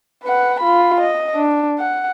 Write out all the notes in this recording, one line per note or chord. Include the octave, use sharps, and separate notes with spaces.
B4 F#5
F4 B5
D#5
D4
F#5